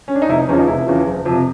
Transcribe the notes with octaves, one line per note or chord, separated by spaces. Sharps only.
C#4
D4
D#4
F1 E4
D#4
E2 C#3 F3 C#4
D#4
F1 E4
E2 C#3 F3
F#1
F2 C3